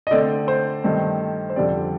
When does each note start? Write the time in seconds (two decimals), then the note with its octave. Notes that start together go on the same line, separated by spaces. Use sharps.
0.07 D#5
0.11 D3 A3 C4 D5
0.48 C5
0.84 G2 D#3 A3 C4
1.50 C5
1.56 F2 D3 G3 C4 D5